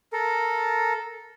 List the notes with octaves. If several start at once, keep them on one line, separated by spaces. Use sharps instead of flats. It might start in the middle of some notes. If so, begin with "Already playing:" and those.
A4 A#4